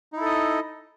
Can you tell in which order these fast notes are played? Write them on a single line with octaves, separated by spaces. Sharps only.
D#4 E4 A4 D#5